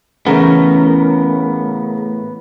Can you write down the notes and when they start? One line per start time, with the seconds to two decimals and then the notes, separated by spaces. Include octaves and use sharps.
0.27 A2 C#3 E3 A3 B3 C#4 A#4